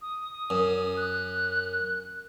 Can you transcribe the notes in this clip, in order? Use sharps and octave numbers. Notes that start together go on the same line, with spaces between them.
D#6
F#2
F#6